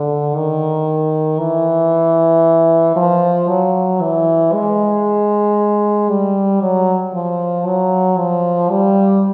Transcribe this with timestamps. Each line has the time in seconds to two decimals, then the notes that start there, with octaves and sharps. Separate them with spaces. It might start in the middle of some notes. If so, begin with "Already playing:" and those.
Already playing: D3
0.36 D#3
1.40 E3
2.97 F3
3.49 F#3
4.01 E3
4.53 G#3
6.09 G3
6.62 F#3
7.14 F3
7.66 F#3
8.18 F3
8.70 G3